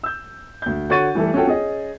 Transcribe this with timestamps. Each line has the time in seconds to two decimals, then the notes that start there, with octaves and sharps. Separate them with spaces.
0.04 E6 G6
0.62 D2 G6
0.90 D3 F#4 C#5 C#6 A6 D#7
1.15 E3 G3 A3 E4 A4
1.34 C#4 F4 F#4 A4 G5
1.47 C#4 G#4 D#5